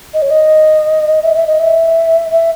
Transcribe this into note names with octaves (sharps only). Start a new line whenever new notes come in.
D#5
C#5
D#5
E5
E5
D#5
E5
E5